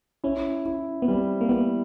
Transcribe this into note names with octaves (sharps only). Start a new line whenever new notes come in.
C#4 E4
E4
B3
G3 C4
A#3
B3 E4